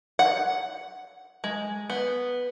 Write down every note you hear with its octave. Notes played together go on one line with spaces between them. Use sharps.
F#5
G#3
B3